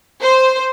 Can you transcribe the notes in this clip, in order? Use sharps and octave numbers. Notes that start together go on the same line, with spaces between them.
C5